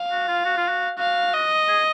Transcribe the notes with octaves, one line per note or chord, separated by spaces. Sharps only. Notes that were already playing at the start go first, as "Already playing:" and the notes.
Already playing: F5
F#4
F4
F#4
F4
F#4
F#4 F5
D#5
G#4